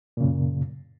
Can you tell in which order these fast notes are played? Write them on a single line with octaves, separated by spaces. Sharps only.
A#2 C#3 F#2